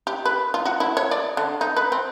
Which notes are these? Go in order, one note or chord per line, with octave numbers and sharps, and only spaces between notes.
G4
B4
F4
F#4
E4
C#5
D5
D3
D#4
B4
C4